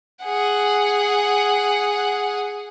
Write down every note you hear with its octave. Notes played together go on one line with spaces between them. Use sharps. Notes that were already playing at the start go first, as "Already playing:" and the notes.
G#4 F#5